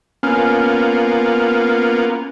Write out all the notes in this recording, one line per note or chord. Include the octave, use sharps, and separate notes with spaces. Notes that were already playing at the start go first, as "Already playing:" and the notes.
A#3 B3 C#4 F4 F6